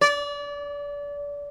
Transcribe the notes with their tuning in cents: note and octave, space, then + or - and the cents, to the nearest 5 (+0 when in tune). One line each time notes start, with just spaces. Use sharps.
D5 -30